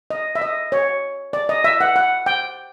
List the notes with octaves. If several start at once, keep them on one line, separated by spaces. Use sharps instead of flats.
D#5
E5
D#5
C#5
D5
D#5
E5
F#5
F#5
G5